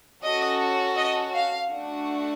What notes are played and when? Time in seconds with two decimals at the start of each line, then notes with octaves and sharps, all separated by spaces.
0.23 C#4 F#4 A4 D#5
0.97 D#5
1.34 F5
1.70 A3 D4 F#4